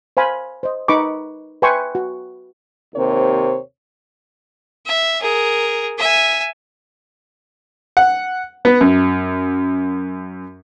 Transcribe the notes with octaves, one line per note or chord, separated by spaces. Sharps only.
C5 F5 G#5 B5
C5 D#5
D#4 B4 B5 C#6 D6
B4 E5 G5 G#5 C6 C#6
F#4
D#2 C3 A#4 C5 C#5
E5
G#4 A#4
E5 G#5
F#5
B3
F#2